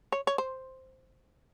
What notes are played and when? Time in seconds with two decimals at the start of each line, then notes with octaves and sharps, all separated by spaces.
0.12 C#5
0.27 C#5
0.38 C5